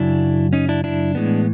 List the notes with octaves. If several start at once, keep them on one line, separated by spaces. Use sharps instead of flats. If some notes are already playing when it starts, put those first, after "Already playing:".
Already playing: F#2 C#3 F#3 D4 E4
C#4 D#4
D4 E4
D4 E4
A2 E3 G#3 B3